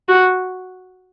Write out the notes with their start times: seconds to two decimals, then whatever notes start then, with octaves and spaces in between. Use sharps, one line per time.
0.09 F#4